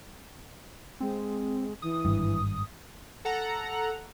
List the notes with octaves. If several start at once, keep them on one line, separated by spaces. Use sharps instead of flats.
G#3 C4
E3 D#6
G#1 G2
A4 F#5 A#5